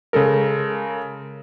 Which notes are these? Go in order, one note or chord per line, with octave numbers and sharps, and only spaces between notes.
C#3 G#3 A4 A#4